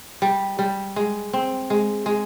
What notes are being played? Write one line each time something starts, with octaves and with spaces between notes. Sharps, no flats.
G3
G3
G#3
C4
G#3
G#3